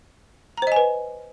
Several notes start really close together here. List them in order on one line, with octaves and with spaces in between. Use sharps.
A#5 C5 D#5 G#5 B4